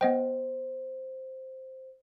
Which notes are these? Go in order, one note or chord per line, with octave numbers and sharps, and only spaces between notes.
B3 C5 D#5 G5